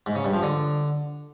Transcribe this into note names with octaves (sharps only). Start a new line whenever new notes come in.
G#2
C#3
G2
F3
D3